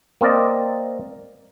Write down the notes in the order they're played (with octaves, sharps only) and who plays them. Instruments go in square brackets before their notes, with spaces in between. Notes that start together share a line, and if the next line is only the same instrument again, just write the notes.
[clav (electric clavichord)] A#3 C4 A#4 D5 D#5